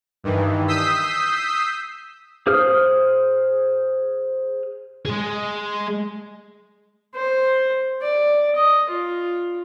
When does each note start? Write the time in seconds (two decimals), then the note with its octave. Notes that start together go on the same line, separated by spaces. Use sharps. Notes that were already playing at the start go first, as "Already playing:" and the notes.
0.24 G2 D#3 E3
0.68 D#6 E6 G6 B6 C7
2.47 G#4 C5 F5 D#6 F6
5.05 G#3 G#4
7.15 C5
8.02 D5
8.56 D#5
8.90 F4